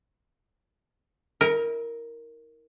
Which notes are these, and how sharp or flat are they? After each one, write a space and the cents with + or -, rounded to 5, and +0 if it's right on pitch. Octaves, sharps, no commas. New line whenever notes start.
E4 -40 A#4 +0